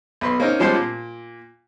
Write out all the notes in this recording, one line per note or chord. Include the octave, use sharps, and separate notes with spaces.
B1 B4 C6
A#3 C4 C#4 D#4
F3 G3 G#3 C#4 G4 C5
A#2